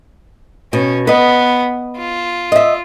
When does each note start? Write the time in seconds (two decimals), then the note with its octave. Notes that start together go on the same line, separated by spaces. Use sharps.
0.73 B2 C#4
1.07 B3 B4 D#5
1.98 F4
2.52 D#5 E5